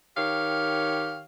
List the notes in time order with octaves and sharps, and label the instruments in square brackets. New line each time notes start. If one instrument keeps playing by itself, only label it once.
[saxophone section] D#3 G4 C#5 F5